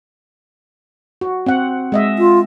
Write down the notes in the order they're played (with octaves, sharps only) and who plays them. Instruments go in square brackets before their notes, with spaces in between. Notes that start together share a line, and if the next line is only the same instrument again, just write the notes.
[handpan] F#4
C4 F#5
G#3 D#5 E5
[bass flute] F4